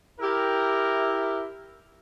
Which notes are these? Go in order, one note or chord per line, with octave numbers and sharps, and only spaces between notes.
E4 G4 A#4